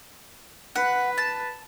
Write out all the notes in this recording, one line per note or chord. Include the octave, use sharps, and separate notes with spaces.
B4 F#5
A5